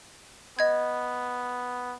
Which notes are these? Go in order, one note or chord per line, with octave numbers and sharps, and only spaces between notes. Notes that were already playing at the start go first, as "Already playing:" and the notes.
B3 D#5 G#6